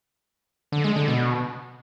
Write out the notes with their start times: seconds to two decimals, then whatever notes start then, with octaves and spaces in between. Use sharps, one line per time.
0.72 D3
0.84 G#3
0.96 D3
1.08 B2